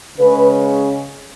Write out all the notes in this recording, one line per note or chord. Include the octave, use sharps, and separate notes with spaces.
C#3 G#3 C#4 B4